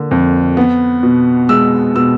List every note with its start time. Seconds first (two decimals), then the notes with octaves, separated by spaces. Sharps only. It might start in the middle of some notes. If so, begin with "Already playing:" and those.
Already playing: D3 A#3
0.11 F2
0.57 B3
1.03 B2
1.49 G#3 E6
1.95 B2 E6